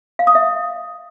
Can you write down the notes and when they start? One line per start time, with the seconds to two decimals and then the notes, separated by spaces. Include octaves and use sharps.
0.19 F5
0.27 D#6
0.35 E5